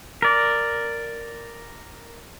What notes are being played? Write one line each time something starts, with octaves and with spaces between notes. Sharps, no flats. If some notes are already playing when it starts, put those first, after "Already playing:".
A#4 D5